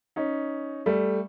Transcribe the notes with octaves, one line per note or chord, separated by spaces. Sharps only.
C#4 D#4
G3 A3